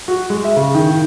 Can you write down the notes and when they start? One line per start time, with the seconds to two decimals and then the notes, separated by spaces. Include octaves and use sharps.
0.08 F#4
0.30 G#3
0.44 E5
0.56 C#3
0.75 D#3
0.90 D#3